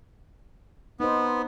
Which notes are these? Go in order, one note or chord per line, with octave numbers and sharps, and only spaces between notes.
B3 D#4 C5